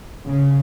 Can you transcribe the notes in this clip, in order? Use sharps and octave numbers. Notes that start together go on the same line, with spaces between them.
C#3